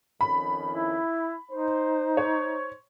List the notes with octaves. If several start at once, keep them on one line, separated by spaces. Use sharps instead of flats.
F2 D#3 C#4 B5
E4
D#4 C5
C#5